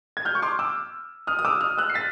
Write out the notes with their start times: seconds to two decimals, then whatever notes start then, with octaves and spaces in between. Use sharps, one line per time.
0.17 G#6
0.25 F6 G6
0.35 C#6
0.42 C6 D6
0.59 D6 E6
1.27 D#6 F6
1.39 D#6
1.45 D6 E6
1.61 D#6 F6
1.78 E6 F#6
1.90 C7
1.94 A6 B6